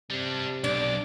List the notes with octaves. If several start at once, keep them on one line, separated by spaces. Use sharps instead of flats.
C3 G3 D4
B1 D4 D5